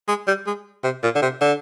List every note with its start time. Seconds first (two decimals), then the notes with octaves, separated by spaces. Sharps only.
0.08 G#3
0.27 G3
0.46 G#3
0.83 C3
1.03 A#2
1.15 D3
1.22 C3
1.41 D3